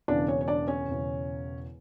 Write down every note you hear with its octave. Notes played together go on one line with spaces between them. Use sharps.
E1 E2 C#3 D4 D5
C#4 C#5
C#5
D4 D5
C#4 C#5
E1 E2 C#3